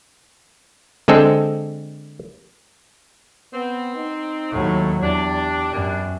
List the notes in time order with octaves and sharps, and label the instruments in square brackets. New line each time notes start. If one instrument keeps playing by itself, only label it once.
[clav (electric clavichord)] D3 G#3 C4 A4
[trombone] B3 [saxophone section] C4
[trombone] D#4
[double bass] D#2 F#3 [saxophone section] A2
[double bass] E2 [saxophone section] D4 [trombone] G4
[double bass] F#2 [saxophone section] B2 A#3 D4